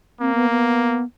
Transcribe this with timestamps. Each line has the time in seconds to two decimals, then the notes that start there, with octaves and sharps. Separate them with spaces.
0.20 A#3 C4
0.35 B3
0.50 B3